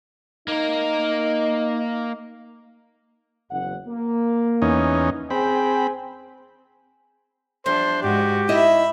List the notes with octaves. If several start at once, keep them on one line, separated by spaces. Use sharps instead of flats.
A#3 D#4 A#4
F#1 E2 F#5
A#3
E2 C#4 D#4
C4 G#4 G5 G#5 B5
E2 F3 G3 D4 C5
G#2 F#4 G4
D#4 E4 D#5 E5 B5